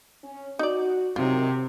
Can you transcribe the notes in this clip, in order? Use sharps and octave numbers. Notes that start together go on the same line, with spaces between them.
C#4
D#4 F#4 D5
C3 D#3 F#3 F4